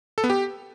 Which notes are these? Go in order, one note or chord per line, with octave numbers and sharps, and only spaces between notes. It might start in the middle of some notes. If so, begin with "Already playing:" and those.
A4
B3
G4